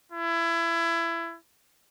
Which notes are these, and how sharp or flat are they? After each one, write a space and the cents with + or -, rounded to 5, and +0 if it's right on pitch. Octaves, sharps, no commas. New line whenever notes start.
E4 +25